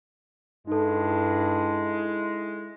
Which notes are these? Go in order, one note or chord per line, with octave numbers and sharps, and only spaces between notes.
G2 G#3 D#4 E4 A4